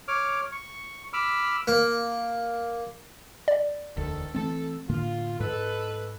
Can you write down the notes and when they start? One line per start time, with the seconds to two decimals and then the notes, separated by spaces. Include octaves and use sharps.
0.08 C#5 D6 F6
0.52 C#6
1.13 B5 D6 E6 F6
1.68 A#3
3.48 D5
3.97 E1 D2 D#3 A4
4.34 E3 A3 C4 A4
4.89 A2 D3 A#3 F4
5.40 G#2 D#4 A4 B4